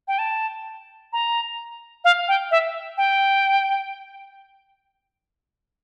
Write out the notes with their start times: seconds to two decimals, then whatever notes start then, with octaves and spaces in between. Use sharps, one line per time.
0.08 G5
0.19 A5
1.13 A#5
2.05 F5
2.28 G5
2.51 E5
2.98 G5